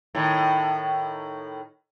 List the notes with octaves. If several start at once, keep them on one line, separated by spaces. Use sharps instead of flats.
A2 D#3